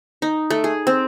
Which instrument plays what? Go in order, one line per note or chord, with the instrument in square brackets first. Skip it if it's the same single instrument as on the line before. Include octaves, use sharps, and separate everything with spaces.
[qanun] D#4
A3
G#4
C4